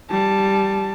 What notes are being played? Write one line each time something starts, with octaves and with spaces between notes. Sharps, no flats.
G3 A5